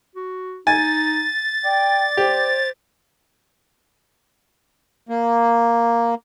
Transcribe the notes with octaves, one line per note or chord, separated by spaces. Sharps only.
F#4
D#4 G#5 A6
D5 G5
G4 C5
A#3